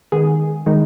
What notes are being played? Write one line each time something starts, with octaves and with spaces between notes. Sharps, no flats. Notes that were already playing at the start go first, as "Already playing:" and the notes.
D#3 G#3 B3 G#4
D#3 G#3 D#4